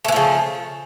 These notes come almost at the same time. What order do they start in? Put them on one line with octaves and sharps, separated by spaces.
A3 E3 F3 C#3